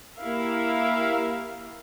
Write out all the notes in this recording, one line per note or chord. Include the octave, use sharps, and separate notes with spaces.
A#3 E4 G4 A#4 E5 F5